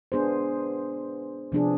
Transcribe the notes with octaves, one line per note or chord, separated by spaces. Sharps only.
B3 D4 G#4 C5
C3 F3 B3 D4 G#4